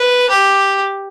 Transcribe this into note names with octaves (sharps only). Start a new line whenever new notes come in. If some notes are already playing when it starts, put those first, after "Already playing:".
Already playing: B4
G4